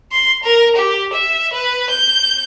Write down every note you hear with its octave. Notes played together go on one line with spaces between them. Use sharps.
C6
A#4
G4
E5
B4
G6